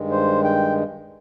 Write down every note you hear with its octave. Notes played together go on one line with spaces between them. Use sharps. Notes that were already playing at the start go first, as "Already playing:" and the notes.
Already playing: G2 D#3 G#3
C5
G5